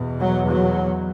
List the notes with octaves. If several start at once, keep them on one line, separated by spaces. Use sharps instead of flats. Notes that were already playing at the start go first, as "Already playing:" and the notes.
Already playing: E2 B2
F#3
F#3